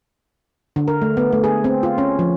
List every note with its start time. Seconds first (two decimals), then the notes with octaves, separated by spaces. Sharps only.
0.76 D3
0.88 A#4
1.02 A3
1.17 B3
1.33 A3
1.44 G#4
1.64 C4
1.83 F4
1.98 C#4
2.19 F3